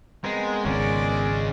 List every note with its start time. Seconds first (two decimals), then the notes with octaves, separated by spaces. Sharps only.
0.24 G#3 B3 C4 A#4
0.65 G#1 C#2 C#3 G#3 C#4 D5